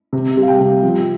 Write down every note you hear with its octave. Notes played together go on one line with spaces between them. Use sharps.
C3
G3
F5
G5
C3
F3